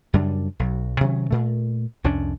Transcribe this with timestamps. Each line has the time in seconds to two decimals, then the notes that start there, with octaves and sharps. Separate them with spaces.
0.13 F#2 C#3 G3 D4
0.59 B1 F#3
1.00 C3 D#3 F#3 C#4
1.31 A#2 A3
2.04 C2 F2 C#4 D4